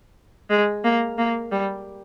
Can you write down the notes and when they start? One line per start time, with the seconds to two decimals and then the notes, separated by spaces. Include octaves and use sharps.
0.50 G#3
0.84 A#3
1.18 A#3
1.52 G3